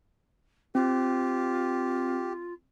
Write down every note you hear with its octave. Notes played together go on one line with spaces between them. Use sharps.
C4 F4 G4